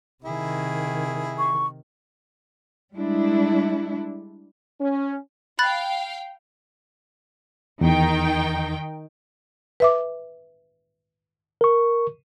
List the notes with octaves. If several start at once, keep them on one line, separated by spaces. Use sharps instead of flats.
C3 D#3 E4 G#4
C#6
G3 G#3 D4 E4
C#4
F5 G5 B5 F#6 A6
E2 D#3 D#4 G5
B4 E5 D6
A#4 C#6